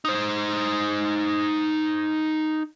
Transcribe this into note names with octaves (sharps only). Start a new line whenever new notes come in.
D#4 C5